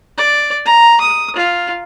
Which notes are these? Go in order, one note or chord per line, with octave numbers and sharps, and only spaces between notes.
D5
A#5
D#6
F4